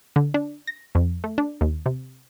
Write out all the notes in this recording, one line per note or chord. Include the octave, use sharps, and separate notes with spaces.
D3
D4
A#6
F2
A3
D4
D#2
C3